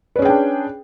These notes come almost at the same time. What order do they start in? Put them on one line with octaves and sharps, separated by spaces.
B4 C#4 G#4 G5 D4